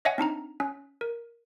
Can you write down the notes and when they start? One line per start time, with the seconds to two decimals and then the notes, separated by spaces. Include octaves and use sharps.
0.05 C#5 D#5 E5 F#5 G#5
0.18 C4 D4 D#4 A#5
0.60 C#4
1.01 A#4